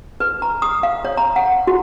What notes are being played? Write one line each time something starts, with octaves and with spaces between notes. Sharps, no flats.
B4
A#5
D#6
F5
C#5
A#5
F#5
F#4